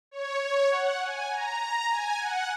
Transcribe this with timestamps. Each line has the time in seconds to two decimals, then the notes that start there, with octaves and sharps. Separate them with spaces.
0.11 C#5
0.41 C#5
0.70 F#5
1.00 G#5
1.30 A#5
1.60 A#5
1.90 G#5
2.20 F#5